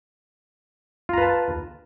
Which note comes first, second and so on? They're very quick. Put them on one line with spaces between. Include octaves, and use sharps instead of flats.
F4 A#5 B4 A5